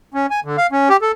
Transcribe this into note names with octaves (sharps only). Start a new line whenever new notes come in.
C#4
G#5
D3
F5
C#4
G4
A4